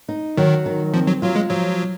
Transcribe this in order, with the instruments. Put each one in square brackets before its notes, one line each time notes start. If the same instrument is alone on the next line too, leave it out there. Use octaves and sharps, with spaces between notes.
[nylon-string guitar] D#4
[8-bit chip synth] D#3 [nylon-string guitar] F#3
[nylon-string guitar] D#3
[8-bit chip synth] F3 [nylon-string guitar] C4
[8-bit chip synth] F#3
[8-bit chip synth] F#3 [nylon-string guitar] F4
[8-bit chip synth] G#3
[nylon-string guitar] F3 [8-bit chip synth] F#3